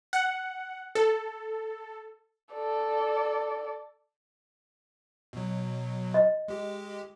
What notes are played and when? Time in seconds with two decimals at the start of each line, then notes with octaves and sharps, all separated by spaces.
0.13 F#5
0.95 A4
2.53 A4 D5
5.33 B2 F#3
6.14 D#5
6.48 G#3 G4